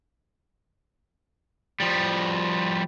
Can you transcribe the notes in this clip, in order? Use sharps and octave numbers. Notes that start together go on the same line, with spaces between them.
F3 G3